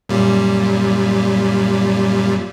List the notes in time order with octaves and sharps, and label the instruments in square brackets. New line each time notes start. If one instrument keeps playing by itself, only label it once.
[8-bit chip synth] F#2 A#2 G3